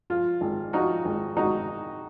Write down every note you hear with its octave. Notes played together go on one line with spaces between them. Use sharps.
F3 F4
G#1
F3 D#4 F#4
G#1
G#1 D#4 F#4